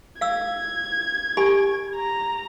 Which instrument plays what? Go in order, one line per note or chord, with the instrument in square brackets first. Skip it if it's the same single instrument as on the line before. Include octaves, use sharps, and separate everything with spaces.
[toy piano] F5 E6 [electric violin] G#6
[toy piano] G4 G#5 B5
[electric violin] A#5